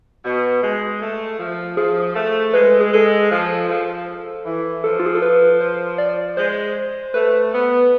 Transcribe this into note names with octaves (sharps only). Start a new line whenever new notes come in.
B2
G#3
A3
F3
F3 G#4
A3 A4
G#3 B4
A4
G#4
G#3 A4
F3
F3
E3
F3 A4
F4
G#4
A4
B4
C5
D5
G#3 C5
A3 B4
B3